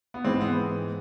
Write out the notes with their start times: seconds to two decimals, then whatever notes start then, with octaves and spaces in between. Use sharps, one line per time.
0.14 B3
0.25 G#2 E3 G#3 C4
0.41 B3